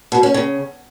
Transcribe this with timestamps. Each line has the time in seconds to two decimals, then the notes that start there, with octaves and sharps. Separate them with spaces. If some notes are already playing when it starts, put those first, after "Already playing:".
0.12 B2
0.23 C#4
0.34 C#3